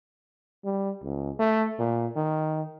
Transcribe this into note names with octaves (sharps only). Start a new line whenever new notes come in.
G3
C#2
A3
A#2
D#3